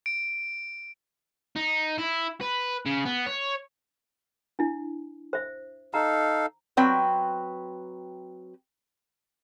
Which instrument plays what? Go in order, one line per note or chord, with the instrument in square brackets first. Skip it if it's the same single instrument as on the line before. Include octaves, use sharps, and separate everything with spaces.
[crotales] D7
[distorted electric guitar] D#4
E4
B4
C#3
B3
C#5
[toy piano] D4 E4
C5 E5
[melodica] D#4 A4 F5 [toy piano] A#5
[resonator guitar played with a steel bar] F#3 C4 B4 G5